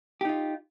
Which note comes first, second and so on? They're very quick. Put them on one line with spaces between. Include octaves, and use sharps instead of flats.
G4 D#4 F4